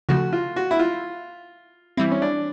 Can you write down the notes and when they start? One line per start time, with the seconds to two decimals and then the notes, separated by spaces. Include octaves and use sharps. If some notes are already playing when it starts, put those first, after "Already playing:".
0.09 C#3 F3 A3 F#4
0.33 F4
0.56 F#4
0.71 E4
0.79 F4
1.97 E3 G3 C4 E4
2.11 C#4
2.22 D4